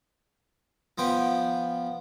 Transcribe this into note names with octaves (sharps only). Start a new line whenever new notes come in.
F3 B3 G5